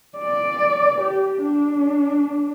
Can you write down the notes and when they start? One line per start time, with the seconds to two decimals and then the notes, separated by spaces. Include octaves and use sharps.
0.18 D5
1.01 G4
1.42 D4